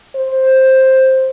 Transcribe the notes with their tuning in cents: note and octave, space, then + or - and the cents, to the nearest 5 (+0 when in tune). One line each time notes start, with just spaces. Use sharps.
C5 +10